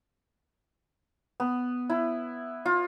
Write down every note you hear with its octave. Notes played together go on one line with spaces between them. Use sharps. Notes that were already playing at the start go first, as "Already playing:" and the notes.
B3
E4
F4